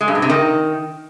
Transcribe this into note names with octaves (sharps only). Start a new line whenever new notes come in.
G#3
G2
B2
C3
D#3